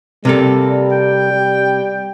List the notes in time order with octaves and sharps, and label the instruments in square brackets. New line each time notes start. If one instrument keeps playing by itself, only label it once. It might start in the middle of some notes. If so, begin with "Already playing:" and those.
[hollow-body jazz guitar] C3 A#3 A4 [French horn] G3
[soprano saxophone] G5
[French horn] G3